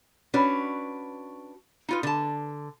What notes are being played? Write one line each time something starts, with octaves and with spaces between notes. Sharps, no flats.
C#4 D4 F#4 B4
D#4 F4 B4
D3 A5